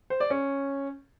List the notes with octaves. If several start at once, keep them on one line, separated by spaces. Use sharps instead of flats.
C5
D5
C#4